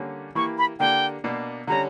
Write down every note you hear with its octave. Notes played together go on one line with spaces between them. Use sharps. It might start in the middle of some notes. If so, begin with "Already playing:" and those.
Already playing: D3 G3 A#3 C#4
E3 A#3 E4 G4 C#6
B5
D3 A#3 D4 G4 G5
B2 A#3 D4
D3 G3 C#4 A#5